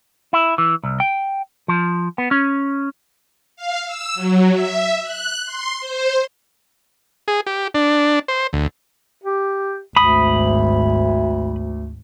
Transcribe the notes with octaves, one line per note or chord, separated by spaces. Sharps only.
E4
E3
C2
G5
F3
B3
C#4
F5
E6
F#3
E5
F#6
C6
C5
G#4
G4
D4
C5
D2
G4
G#1 D2 B5 D#6